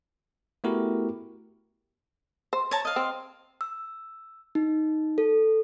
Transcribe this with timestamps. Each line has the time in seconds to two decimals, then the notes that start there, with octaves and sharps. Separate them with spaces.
0.64 A3 B3 E4 F#4 G4 A#4
2.53 C5
2.71 C#5 A5 A#5
2.85 D#5 F5
2.96 C4
3.61 E6
4.55 D#4
5.18 A4